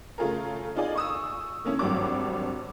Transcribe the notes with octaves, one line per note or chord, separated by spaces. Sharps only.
C#3 A3 F4 G#4 A#4
D#4 F4 G#4 D5 G#5
C#6 D#6 E6
D3 A#3 C#4 E4
G#1 F#3 G3 D4 D6